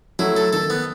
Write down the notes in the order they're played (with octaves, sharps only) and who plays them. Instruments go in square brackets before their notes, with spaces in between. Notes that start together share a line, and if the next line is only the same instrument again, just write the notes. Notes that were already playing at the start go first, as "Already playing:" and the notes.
[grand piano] F#3 A3 [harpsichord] E4
[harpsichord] A4
[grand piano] D#3 [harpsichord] A4
[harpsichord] B3